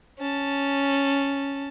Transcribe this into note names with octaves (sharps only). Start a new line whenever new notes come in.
C#4 A5